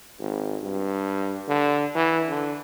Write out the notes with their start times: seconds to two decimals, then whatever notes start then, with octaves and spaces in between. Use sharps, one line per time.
0.19 G#1
0.62 G2
1.48 D3
1.95 E3
2.29 D3